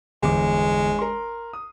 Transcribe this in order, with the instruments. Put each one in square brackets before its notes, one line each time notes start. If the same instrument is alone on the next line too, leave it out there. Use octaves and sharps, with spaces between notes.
[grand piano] G1 E2 D6 [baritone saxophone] G#3
[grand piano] A#4 C6
D#6